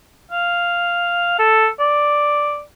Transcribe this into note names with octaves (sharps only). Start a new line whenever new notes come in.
F5
A4
D5